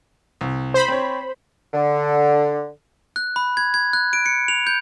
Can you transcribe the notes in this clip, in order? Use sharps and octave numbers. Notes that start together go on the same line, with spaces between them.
C2
C5 B5
C4 C#5
D3
F#6
B5
G#6
G#6
F#6
D7
C#7
F7
G6